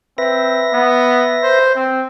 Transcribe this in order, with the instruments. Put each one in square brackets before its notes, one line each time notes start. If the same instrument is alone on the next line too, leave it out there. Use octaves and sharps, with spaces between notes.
[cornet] C4 [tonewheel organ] B4 E5 A#6
[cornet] B3
C5
C4